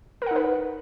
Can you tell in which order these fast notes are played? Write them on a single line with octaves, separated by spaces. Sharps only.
A#4 F#5 D#4 B4